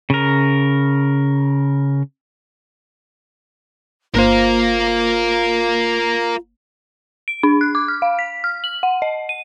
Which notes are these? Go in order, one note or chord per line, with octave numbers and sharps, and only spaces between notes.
C#3 A#4
G1 A#3 F4 A#4 C5 F5
D7
D4
F#6
D6
F6
F5
B6
F6
F#7
F#5
D#5
D#7